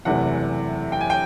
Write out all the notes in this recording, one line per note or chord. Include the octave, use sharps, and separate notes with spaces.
F#1 E2 C3 E3 A3 F#5
G5
G#5
G5